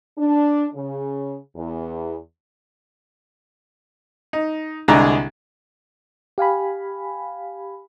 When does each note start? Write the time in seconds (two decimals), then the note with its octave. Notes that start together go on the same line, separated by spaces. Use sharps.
0.17 D4
0.74 C#3
1.55 E2
4.33 D#4
4.88 C2 D3 G#3 D4 A#5
6.38 G4 F5 G#5 B5